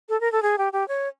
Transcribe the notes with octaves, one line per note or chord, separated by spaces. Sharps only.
A4
A#4
A4
G#4
G4
G4
C#5